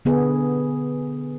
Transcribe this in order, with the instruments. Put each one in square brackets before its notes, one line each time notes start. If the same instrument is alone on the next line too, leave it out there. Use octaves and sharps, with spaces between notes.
[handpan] D3 B3 G#4